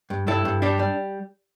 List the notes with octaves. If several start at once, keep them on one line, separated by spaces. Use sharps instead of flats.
G2
G2 E4 A4
G2
G3 D4 G4
G3